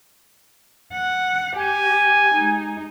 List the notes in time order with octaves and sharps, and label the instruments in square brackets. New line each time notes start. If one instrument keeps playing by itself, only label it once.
[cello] F#5
[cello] G4 [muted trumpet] G#5
[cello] G#3 D#4